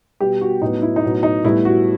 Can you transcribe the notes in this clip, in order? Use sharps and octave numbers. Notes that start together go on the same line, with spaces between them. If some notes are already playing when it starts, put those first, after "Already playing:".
B2 G3 B3 G4
F#4
A2 F#3 B3 D#4
E4
D#4
A2 F#3 B3
D#4
A2 G3 B3 E4
F#4